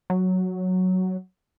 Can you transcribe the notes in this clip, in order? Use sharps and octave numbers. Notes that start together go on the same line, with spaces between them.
F#3